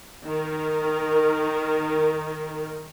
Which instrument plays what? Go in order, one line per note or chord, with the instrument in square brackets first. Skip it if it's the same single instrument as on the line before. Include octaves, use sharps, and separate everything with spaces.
[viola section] D#3 A#4